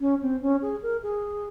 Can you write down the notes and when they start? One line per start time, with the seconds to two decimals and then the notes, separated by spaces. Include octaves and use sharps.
0.01 C#4
0.22 C4
0.42 C#4
0.62 G#4
0.83 A#4
1.03 G#4